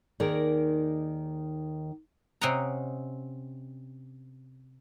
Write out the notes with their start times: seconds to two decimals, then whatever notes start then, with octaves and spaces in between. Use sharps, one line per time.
0.20 D#2 D#3 D#4 G#4 A#4 D5
2.41 C3 C4 C#4 D#5 F#5 A#5